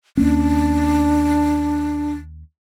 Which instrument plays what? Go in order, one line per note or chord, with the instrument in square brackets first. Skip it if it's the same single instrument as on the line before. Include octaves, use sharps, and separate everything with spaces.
[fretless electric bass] D#2 A#3 C#4 [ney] D4